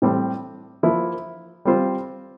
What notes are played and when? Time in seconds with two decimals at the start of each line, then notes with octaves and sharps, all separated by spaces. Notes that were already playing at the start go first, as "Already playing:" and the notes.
0.02 A2 G3 C4 G4 C5
0.83 F3 A#3 E4 A#4
1.65 G3 C4 F4 C5